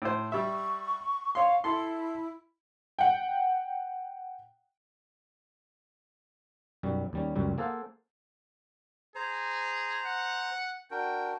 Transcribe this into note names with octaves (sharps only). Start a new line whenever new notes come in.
A2 C5
G3 E5 C#6
C#5 F5 C6
E4 A4 C6
F#5 G5
B1 F#2 G3
D#2 G3 C#4
C#2 F#2 G3
A#3 G#4 A4 C5 F5 F#5
G#4 C5 A#5
F#5
D4 F#4 A#4 G5